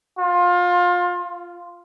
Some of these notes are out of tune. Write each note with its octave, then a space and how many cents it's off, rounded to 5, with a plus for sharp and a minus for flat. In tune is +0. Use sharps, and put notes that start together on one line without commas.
F4 +25
F4 -5